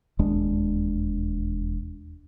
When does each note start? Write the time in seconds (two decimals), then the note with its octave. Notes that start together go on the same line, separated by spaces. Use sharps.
0.19 E1 D#2 G#3 D4